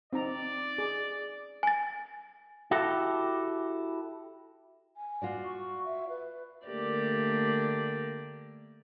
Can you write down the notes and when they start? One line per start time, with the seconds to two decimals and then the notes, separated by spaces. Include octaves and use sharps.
0.13 C4 D#4 D5 A#5
0.78 G#4
1.63 G#5 A6
2.71 E4 F#4 G4 A4
4.97 G#5
5.22 F4 F#4 D5
5.45 C#6
5.84 E5
6.09 B4
6.68 D3 A3 A#3 G4 A#4 D5